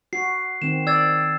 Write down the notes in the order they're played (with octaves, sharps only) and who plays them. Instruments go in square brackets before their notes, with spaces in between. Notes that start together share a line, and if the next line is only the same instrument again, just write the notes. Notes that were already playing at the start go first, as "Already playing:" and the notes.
[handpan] F#4 [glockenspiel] C7
[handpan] D#3 C4 [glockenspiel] E7
[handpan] D5 [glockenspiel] E6 G#6 A6